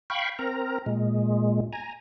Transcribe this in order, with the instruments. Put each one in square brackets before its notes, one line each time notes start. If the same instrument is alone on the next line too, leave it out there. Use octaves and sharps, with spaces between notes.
[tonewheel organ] F5 G5 B5 C#6
C4 A#4 A#5
A#2 G#3
G#5 A#5